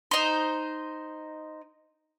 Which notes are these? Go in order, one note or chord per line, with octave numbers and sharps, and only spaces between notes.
D#4 C5